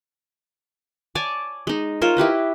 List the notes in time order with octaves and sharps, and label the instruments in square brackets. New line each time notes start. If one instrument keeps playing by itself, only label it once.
[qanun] C#5 D5 G#5 A5
G#3 D#4
F4 A#4 C5 C#5
E4 G4 B4 D#5